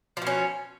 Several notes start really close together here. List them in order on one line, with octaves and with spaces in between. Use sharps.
F3 B2 C#4